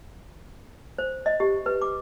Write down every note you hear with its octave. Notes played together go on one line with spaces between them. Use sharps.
C5
D#5
G4
B4
D6